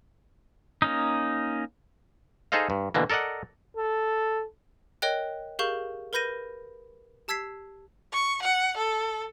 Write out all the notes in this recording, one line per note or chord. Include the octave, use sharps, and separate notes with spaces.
A#3 C#4 D#4
D#4 G#4 A4 C5 D#5 F5
G2
B2 D3 E3 A#3
A4 A#4 D5 D#5 F#5
A4
A#4 C#5 D#5 G5 F#6
G4 G#4 A#4 F5 C#6 G6
A#4 B4 B5 G6 A#6 D#7
G4 A5 E6 G#6 B6 C7
C#6
F#5
A4